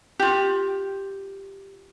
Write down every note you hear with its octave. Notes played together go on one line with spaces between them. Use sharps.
F4 G4